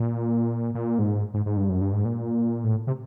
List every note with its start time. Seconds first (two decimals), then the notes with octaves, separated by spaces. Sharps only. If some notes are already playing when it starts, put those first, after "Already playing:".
Already playing: A#2
0.74 A#2
0.99 G#2
1.34 G#2
1.46 G#2
1.57 G2
1.69 F#2
1.81 G2
1.93 G#2
2.05 A#2
2.64 A2
2.87 C3